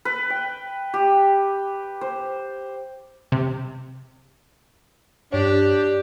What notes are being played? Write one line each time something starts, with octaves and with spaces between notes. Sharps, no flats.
B4
G5
G4
C5
C3
G2 D4 G4 C#5